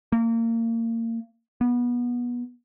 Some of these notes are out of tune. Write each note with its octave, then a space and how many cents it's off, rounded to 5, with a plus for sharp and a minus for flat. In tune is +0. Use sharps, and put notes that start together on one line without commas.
A#3 -30
B3 -25